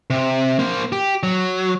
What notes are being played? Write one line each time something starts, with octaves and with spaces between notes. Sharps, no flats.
C3
A#3 C5
G4
F#3